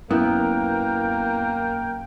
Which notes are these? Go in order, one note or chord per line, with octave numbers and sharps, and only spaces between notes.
F#2 A#3 B3 E4 A#4 G5 F#6